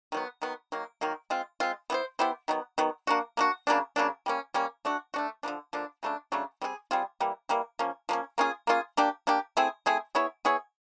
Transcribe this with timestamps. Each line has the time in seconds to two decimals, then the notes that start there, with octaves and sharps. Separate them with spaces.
0.12 D#3 F#3 B3
0.42 D#3 F#3 B3
0.72 D#3 F#3 A#3
1.01 D#3 F#3 A#3
1.30 G#3 C4 F4
1.60 G#3 C4 F4
1.90 B3 E4 G4 C5
2.19 B3 E4 G4 C5
2.48 D#3 F#3 B3
2.78 D#3 F#3 B3
3.07 A#3 D4 F#4
3.37 A#3 D4 F#4
3.67 C#3 F#3 A#3 D4
3.96 C#3 F#3 A#3 D4
4.26 G3 A#3 C#4
4.54 G3 A#3 C#4
4.85 A3 D4 F#4
5.14 A3 D4 F#4
5.43 D3 F3 A#3 D4
5.73 D3 F3 A#3 D4
6.03 C#3 F#3 A3 D4
6.32 C#3 F#3 A3 D4
6.61 G3 C4 F4 G#4
6.91 G3 C4 F4 G#4
7.20 E3 G3 A#3
7.49 E3 G3 A#3
7.79 F3 A#3 C#4
8.09 F3 A#3 C#4
8.38 A#3 C#4 F4 G#4
8.67 A#3 C#4 F4 G#4
8.97 A#3 D4 G4
9.27 A#3 D4 G4
9.57 A3 C4 E4 G#4
9.86 A3 C4 E4 G#4
10.15 B3 E4 G#4 C#5
10.45 B3 E4 G#4 C#5